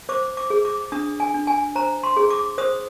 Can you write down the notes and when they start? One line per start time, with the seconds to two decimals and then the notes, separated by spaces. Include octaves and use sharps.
0.09 C5 D6
0.37 D6
0.50 G#4
0.65 D6
0.92 D4 D#6
1.20 G#5
1.34 D4
1.47 G#5
1.75 C5 A#5
2.03 C6
2.17 G#4
2.30 D6
2.58 C5 D#6